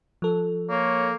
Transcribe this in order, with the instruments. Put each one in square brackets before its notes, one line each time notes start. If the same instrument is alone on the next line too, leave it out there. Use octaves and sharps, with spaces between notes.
[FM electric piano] F3 A4
[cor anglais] A#3 [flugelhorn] C#5